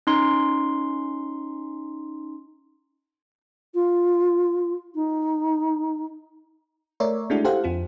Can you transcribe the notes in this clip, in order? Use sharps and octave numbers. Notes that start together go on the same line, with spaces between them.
C#4 D#4 C6
F4
D#4
A3 A#4 C#5 D5 E5
G#3 A3 D4 E4 F#4
E4 G4 A4 C5 F5 F#5
F2 C4 F4